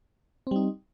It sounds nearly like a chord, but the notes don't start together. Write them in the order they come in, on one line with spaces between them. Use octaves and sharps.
C4 G3 D#4